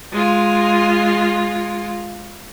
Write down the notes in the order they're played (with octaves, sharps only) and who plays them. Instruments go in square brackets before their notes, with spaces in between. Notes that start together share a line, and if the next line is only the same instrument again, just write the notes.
[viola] G#3 F4